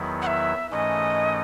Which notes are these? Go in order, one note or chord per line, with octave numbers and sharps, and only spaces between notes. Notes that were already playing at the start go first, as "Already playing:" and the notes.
Already playing: E2 D#3 F#3 B3 E4
F#5
E5
G#2 E3 A3 C#4 D#5